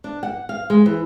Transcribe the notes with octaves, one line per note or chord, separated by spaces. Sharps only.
D4
F#5
F5
G#3
E3